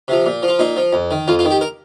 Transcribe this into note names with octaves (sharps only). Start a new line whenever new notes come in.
C3 F3
A#2
F3
F4
A#2 D#4
F3
F2
D#3
F2 F4
F4
D#3
G4
A#4